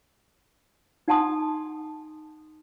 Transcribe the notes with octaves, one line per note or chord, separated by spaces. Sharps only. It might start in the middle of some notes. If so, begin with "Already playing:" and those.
D#4 F#5 G#5 A5 C6 D#6